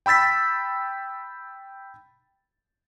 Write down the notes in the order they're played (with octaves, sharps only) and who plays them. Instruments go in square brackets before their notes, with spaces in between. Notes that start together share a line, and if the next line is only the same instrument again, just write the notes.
[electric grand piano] G5 B5 E6 A6 B6